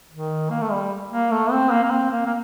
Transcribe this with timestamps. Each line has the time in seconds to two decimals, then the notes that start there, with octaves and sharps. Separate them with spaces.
0.12 D#3
0.50 A#3
0.61 A3
0.71 G3
1.11 A#3
1.31 A3
1.51 C4
1.72 A#3
1.84 A#3
1.91 C4
2.11 A#3
2.26 A#3